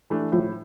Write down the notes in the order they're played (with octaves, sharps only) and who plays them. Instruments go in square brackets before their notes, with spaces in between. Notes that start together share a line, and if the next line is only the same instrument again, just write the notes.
[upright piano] E3 A3 D4
[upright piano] A2 [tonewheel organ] F3